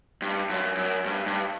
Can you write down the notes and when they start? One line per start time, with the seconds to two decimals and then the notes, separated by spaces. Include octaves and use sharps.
0.22 G2
0.49 F#2
0.77 F#2
1.06 G2
1.26 G2